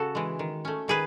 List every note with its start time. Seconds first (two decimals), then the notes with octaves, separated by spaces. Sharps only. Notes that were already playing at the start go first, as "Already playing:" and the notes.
Already playing: C#3 F#4 A4
0.15 E3 G#3
0.39 D#3
0.65 A3 C#4
0.88 D#3 G#4 B4